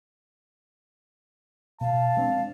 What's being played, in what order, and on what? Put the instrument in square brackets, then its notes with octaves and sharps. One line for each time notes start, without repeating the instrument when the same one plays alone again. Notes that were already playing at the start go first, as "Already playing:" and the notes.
[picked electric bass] B2 [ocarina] F5 [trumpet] A5
[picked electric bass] G#3 C4 D4